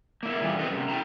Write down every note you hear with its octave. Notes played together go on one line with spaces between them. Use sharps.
A#3 E4
A#2 D3 E3 F3 G3
C4 G4 A4 B4 D#5
F#2 C3
E4 F#4 G5 A#5